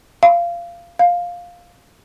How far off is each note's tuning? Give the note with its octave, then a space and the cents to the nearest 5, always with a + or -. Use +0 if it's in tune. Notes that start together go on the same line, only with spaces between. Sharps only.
F5 -20
F5 +10